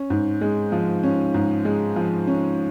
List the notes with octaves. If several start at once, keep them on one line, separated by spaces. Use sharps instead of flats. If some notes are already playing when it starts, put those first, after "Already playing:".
Already playing: C#4
G#2
G#3
F3
C#4
G#2
G#3
F3
C#4